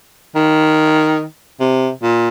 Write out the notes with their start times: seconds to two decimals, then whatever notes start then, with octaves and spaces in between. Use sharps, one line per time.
0.35 D#3
1.60 C3
2.03 A#2